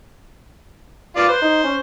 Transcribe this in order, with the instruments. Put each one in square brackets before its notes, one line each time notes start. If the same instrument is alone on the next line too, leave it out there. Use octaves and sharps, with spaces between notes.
[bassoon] G2 [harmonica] F4 D5
[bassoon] B4 [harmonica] C5
[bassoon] D#4
C#4